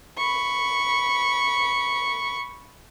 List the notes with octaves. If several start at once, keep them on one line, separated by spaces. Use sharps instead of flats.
B5 C#6